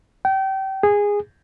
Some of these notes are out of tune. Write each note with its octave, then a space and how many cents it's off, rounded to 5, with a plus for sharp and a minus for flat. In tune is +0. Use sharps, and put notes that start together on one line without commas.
G5 -30
G#4 -15